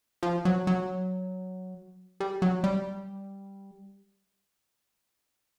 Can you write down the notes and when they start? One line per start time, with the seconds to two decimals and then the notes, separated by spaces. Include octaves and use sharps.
0.23 F3
0.45 F#3
0.67 F#3
2.20 G3
2.42 F#3
2.64 G3